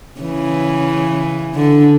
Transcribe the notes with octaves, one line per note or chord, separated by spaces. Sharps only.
C#3 E3
D3